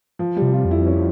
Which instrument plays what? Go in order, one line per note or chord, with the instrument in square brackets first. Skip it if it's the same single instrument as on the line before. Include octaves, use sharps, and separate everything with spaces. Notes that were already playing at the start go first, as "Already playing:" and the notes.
[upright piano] F3
G3
[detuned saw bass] C3
[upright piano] F4
[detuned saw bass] F2
[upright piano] E4
C#4